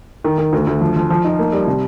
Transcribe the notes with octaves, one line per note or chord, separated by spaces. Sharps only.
D#3
D#3
D2
D2
F3
F3
F3
D#4
A#3
G3
C3